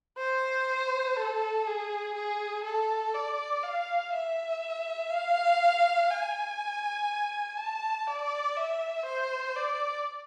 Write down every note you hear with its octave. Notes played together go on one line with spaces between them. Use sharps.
C5
A4
G#4
G#4
A4
D5
F5
E5
F5
G#5
A5
D5
E5
C5
D5